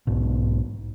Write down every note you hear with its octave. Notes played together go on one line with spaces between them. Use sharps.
B1 G#2 B2